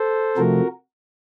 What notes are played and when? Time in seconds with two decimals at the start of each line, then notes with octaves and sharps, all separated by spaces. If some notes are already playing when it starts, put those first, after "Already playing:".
Already playing: A4 C5
0.37 C3 F3 A3 F#4 A#4